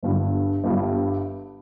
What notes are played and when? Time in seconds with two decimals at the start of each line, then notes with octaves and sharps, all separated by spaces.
0.03 G1 G2 D3 G3
0.64 G1 G2 D3 G3